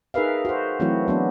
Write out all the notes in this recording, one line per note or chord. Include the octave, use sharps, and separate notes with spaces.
D#4 G#4 A#4 B4 E5 F5
F#4 C5
E3 F#3 A3 C4 E4 F#4
F#3 B3 D4